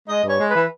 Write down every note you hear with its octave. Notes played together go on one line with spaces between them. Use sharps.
G#3 D#5
G2 C#5
G#3
E3 B4